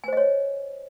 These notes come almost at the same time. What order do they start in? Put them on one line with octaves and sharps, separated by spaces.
G#5 C5 D#5 C#5